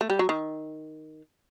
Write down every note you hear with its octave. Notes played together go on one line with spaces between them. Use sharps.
A3
G3
F#3
D#3